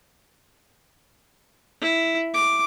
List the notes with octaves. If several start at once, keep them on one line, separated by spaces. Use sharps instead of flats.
E4
D6